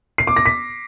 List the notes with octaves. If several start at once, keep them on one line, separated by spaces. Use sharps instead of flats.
C7
D6
A#6
B6